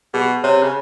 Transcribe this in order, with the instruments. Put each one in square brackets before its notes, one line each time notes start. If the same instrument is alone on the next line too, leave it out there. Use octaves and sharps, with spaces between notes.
[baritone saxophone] B2 [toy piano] G#4
[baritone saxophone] C3 [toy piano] C#5
[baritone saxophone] C#3